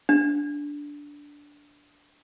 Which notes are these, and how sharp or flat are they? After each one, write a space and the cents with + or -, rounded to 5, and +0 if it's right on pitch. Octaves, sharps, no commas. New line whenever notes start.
D4 -10